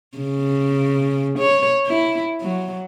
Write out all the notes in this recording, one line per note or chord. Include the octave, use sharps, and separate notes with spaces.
C#3
C#5
E4
F#3